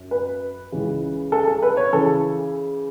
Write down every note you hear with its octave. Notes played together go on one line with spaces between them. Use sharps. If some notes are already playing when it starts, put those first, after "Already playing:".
Already playing: F#2
B4
C#2 C#3 E3
A4
A4
B4
C#5
C#3 E3 A4